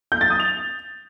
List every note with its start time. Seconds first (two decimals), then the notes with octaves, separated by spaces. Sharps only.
0.12 G6
0.21 A6
0.30 D#6
0.40 F7